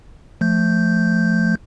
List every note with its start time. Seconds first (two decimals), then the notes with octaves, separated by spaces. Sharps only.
0.41 F3 A3 G6